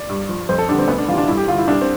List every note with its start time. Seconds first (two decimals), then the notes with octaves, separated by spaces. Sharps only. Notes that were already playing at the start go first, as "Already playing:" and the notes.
Already playing: D5
0.09 G2
0.29 F3
0.49 F2 C5
0.58 A4
0.69 D3 G3 D4
0.79 C4
0.88 D2 B3
0.98 D4
1.08 C3 E3 F4
1.18 D4
1.28 G2 E4
1.37 G4
1.48 D3 G3 F4
1.58 E4
1.67 C2 D4
1.81 C4